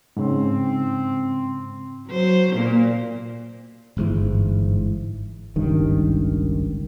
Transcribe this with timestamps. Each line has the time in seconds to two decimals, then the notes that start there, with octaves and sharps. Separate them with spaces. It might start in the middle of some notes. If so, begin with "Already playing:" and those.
0.17 G#2 C#3 C4
2.07 F#3 C5
2.54 A#2 A#3
3.97 G1 G#2 E3
5.56 G#1 C#2 G2 D#3